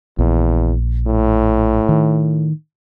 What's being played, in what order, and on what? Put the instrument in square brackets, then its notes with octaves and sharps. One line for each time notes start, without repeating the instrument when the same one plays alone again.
[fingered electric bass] A#1 [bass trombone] E2
[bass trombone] A2
[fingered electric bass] D#3